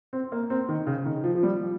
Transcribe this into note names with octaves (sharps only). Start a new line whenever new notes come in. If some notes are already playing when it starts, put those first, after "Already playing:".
C4
A#3
C4
D#3
C#3
D#3
F3
F3
G3
F3